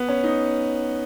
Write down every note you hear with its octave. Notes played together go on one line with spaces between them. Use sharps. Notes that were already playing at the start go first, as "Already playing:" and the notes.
Already playing: B3
C#4
D#4